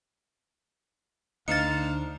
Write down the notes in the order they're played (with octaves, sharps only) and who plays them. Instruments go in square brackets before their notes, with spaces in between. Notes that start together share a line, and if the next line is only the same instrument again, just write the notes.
[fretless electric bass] D2 [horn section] D4 C5 F5 [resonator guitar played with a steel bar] D#4 [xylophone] A6 C#7